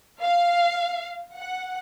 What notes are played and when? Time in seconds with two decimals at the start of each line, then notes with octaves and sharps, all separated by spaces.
0.22 F5
1.35 F#5